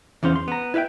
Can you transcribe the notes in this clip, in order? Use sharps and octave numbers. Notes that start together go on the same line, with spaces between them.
E2 E3 C#4 C5 F5
C6
B3 A#5
E4 B4 E5 F5 G5